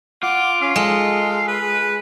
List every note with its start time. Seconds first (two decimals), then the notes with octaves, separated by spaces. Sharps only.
0.23 F4 F#5 D6
0.62 C#4 F5
0.76 G#3 A4
1.48 B4